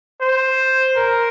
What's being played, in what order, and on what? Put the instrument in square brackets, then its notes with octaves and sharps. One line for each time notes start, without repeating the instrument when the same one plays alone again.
[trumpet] C5
A#4